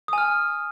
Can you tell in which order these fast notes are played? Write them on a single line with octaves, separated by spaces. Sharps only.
D#6 G#5 F6